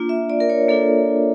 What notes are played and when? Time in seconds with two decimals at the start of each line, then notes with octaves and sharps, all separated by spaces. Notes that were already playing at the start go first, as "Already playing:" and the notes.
Already playing: A#3 D4 F4
0.09 E5
0.30 D5
0.40 A#4
0.49 C#5
0.69 A#3 D4 F4 A4